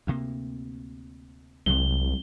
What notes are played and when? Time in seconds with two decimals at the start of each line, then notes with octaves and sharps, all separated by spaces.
0.07 D2 C3 A#3
1.66 C2 C3 F#3 G#3 G7